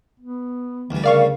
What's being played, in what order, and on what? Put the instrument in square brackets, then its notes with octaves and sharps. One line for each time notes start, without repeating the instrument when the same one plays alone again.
[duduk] B3
[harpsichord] D2 G3 [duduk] E3
[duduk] C#3 [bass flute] A#4 [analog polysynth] D5 F5 C#6